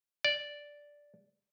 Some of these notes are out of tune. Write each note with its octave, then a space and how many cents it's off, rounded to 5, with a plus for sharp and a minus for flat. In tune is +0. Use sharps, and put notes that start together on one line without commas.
D5 -5